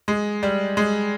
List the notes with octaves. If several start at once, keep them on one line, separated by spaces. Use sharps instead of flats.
G#3
G3
G#3